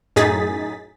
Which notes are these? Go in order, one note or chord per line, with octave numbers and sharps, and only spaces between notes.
F#2 A2 D#4 G#4 A6 B6